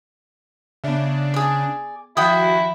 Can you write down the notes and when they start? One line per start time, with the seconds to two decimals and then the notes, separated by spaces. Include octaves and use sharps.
0.84 C#3 B3 D4 E5
1.34 G#4 D5
2.17 D#3 F3 E4 F#4 F#5 G5 D#6